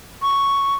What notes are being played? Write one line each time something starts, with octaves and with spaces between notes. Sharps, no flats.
C#6